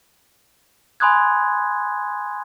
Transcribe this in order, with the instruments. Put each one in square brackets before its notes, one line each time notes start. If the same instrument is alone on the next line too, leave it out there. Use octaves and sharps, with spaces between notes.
[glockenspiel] G#5 B5 C6 D#6 F#6 G#6